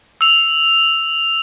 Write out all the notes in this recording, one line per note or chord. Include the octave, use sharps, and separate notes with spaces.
E6 F7